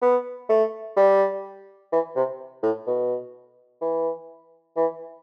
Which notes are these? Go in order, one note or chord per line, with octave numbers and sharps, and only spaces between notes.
B3
A3
G3
E3
C3
A2
B2
E3
E3